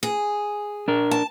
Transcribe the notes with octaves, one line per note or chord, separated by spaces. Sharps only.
G#4
D4 A#4
A5